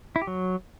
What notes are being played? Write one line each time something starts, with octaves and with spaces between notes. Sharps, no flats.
E4
G4
F#3